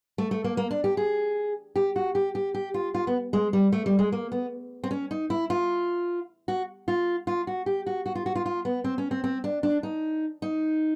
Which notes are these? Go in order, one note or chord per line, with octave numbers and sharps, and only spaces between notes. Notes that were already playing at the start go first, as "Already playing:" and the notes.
A3
A3
A#3
A#3
D4
G4
G#4
G4
F#4
G4
G4
G4
F4
F4
B3
G#3
G3
A3
G3
G#3
A#3
B3
C4
C#4
D#4
E4
F4
F#4
F4
F4
F#4
G4
F#4
F#4
F4
F#4
F4
F4
B3
C4
C#4
C4
C4
D4
D4
D#4
D#4